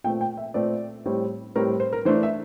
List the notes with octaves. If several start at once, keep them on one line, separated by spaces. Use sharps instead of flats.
A#2 A3 C4 G5
G5
E5
A#2 A3 C4 D5
A2 G3 C4
A2 G3 C4 A#4
C5
A#4
E3 A3 D4 C5
E5